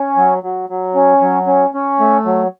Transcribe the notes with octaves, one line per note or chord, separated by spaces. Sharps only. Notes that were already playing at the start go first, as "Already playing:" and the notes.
Already playing: C#4
F#3
F#3
F#3
C#4
F#3
C#4
C#4
A3
F#3